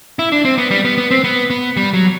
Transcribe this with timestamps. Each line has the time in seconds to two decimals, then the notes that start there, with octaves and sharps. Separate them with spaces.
0.19 E4
0.32 D4
0.45 C4
0.58 B3
0.71 G3
0.85 B3
0.98 B3
1.11 C4
1.24 B3
1.50 B3
1.77 G3
1.93 F#3